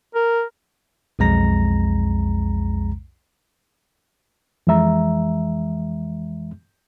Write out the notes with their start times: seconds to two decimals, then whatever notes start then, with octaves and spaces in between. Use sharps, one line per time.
0.15 A#4
1.19 B1 F2 G#3 A#5 A#6
4.67 F2 E3 G#3 E5 A#5